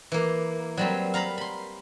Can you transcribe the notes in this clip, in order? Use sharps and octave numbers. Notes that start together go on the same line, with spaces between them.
E3 A#3
F#3 G3 C4
F5 A#5 B5
B5 C6